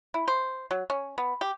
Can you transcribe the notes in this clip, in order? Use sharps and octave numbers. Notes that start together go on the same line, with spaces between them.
E4
C5
F#3
C#4
B3
G4